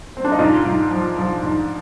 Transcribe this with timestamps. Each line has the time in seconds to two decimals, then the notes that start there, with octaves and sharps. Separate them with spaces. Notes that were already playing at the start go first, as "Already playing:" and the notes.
0.17 C4
0.25 D4
0.32 D#4
0.39 G#2 D4 F4
0.65 G#2
0.91 F3
1.17 F3
1.43 G#2